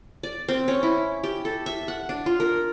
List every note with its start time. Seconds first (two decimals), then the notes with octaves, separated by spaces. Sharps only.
0.23 D5
0.49 C4
0.68 C#4
0.83 E4
1.24 G4
1.45 A4
1.66 E5
1.88 F#5
2.09 D4
2.26 F4
2.40 A#4